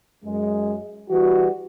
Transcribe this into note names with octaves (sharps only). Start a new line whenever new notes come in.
F#2 G#3
E3 G3 F#4